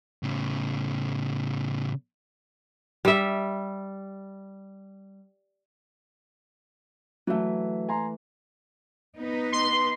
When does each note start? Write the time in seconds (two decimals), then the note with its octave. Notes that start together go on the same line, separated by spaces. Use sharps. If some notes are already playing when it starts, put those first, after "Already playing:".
0.23 A2 C#3
3.05 G3 E5
7.27 E3 F#3 A3 E5
7.89 G#5 A#5 C6
9.17 B3 D#4 B4
9.52 C6